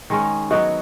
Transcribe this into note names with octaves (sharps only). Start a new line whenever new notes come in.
D#3 G#3 C#4
F#3 B3 F#4 D#5